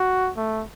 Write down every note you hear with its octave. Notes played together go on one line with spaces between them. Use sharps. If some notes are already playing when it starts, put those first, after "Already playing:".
Already playing: F#4
A3